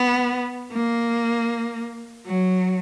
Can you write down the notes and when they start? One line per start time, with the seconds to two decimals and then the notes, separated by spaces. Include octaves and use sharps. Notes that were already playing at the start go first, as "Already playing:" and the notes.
Already playing: B3
0.72 A#3
2.26 F#3